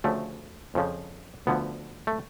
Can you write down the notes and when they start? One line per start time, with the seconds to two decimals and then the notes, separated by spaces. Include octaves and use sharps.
0.04 D2 C#3 F3 A3
0.75 F2 C#3 F3
1.47 D2 D3 F3 B3
2.07 A3